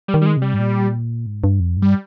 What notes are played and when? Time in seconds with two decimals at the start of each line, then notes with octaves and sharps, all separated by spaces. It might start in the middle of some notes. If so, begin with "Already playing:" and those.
0.08 G3
0.14 D#3
0.22 G3
0.26 G#3
0.37 C3 G3
0.54 G#2
0.59 A#2
1.26 G#2
1.44 G2
1.60 F2
1.77 G2
1.82 G3